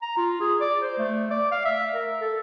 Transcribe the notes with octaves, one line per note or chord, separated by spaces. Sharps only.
A#5
F4
G#4
D5
C5
A3
D5
F5
E5
A#4
A4